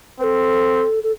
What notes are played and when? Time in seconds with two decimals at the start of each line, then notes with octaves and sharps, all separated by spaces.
0.20 C4 B4
0.24 A4
1.04 A4